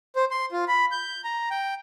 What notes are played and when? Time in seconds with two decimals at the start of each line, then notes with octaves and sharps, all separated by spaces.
0.16 C5
0.31 C6
0.52 F4
0.68 B5
0.91 G6
1.24 A#5
1.51 G5